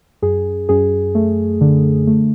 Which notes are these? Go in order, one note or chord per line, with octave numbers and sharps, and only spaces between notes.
F#2 G#4
F#2 G#4
A3
D3
A3